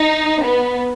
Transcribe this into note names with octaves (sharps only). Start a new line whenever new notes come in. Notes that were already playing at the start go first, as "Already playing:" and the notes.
Already playing: D#4
B3